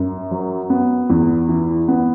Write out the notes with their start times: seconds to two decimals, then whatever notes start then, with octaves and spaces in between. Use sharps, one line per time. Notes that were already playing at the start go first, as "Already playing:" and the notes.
Already playing: F#2
0.31 F#3
0.70 B3
1.10 E2
1.49 E3
1.88 B3